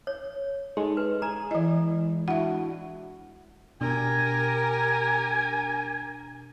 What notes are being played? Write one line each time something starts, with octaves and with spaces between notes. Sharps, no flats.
C#5
G#3 D#4 A4
B4
G#4 G#5 A#5
E3 E4 D#5
D4 E4 F#4 E5 F#5
B2 D4 G4 A#4 G#5